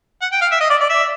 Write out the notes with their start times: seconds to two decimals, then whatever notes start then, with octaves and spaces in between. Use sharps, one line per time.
0.22 F#5
0.32 G5
0.41 F5
0.51 E5
0.61 D#5
0.70 D5
0.80 D5
0.89 E5